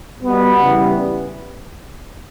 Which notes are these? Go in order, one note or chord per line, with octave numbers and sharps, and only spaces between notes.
B2 G3 B3
C#3 E3 G3